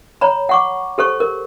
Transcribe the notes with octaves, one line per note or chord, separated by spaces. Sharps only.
C#5 A#5 B5
F#5 C#6 D6
G4 A4 C5 C#6
A#4